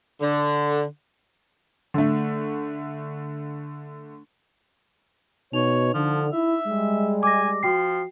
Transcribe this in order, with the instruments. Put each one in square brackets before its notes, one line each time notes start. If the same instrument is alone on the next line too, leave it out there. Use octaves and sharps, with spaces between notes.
[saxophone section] D3
[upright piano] D3 A3
[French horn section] B2 [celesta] D#4 F7 [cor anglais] C#5
[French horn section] D3 [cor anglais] F3
[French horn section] E4 [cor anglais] E5
[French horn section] G3 G#3
[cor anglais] G#5 [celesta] D6 A#6
[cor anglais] F3 [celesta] F#4 G5 C7